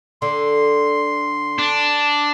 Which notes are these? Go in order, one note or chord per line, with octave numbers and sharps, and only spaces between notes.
D3 C6
D4